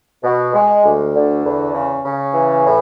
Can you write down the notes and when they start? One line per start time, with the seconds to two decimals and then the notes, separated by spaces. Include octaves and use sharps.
0.23 B2
0.54 G#3
0.84 D2
1.14 D3
1.44 E2
1.74 C#3
2.04 C#3
2.33 E3
2.64 A2